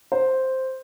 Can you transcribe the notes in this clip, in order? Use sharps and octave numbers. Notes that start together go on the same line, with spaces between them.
C5